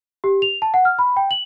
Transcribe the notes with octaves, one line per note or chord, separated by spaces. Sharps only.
G4
F7
A5
F#5
F6
B5
G5
F#7